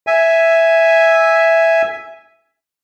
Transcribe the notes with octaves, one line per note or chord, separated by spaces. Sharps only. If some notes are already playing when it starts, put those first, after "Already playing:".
E5 G#5